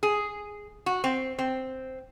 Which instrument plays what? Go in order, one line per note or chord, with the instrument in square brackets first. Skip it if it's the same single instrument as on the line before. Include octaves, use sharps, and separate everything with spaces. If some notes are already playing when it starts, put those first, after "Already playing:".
[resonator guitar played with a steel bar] G#4
F#4
C4
C4